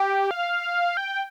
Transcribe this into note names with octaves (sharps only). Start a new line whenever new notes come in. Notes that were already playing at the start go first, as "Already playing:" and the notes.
Already playing: G4
F5
G5